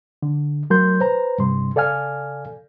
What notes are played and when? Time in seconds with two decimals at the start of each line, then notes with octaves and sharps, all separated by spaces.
0.22 D3
0.70 F#3 A3 A#4 C6 G6
1.01 B4 C5 A#5
1.38 G2 C3 G3 C6
1.75 C#3 A4 D5 F5 G#5 F6